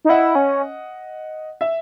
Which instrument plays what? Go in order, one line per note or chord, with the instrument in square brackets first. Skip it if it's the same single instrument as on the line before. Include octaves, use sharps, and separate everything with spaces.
[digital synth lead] D#4
[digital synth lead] E4 [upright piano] D#5 F#5
[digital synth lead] C#4
[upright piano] E5